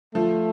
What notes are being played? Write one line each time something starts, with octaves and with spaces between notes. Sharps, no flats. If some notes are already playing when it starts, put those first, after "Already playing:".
F3 A3